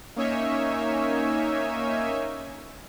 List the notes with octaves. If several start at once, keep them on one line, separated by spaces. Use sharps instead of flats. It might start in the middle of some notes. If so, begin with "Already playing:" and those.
A#3 C#4 D#4 C#5 E5 G#5